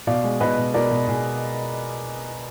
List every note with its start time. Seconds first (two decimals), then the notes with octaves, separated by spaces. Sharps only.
0.07 B2 D5 F5
0.24 G#3
0.40 B2 B4 D#5
0.58 B2
0.74 B2 A#4 D5
0.91 B2
1.08 B2 G#4